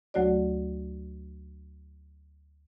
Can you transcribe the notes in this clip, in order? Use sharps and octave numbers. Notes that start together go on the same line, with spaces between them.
D2 F#3 A3 F#4 C#5 D5